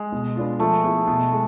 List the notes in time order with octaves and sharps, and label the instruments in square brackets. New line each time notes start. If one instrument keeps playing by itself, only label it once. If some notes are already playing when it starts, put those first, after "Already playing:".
Already playing: [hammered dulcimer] G#3
[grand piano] B2
B3 D4 F4
[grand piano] F3 [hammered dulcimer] A3
[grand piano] B3 E4 G#4
B2
G#3